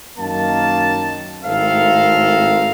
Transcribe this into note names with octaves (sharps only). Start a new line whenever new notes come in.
F#2 D#3 A#3 A5
G#1 A2 C4 A4 A#4 F5